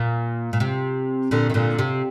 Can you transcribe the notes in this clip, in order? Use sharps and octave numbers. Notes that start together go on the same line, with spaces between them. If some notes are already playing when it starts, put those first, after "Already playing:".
Already playing: A#2
A#2
C3
A#2 D3
D#3
A#2 D3
C3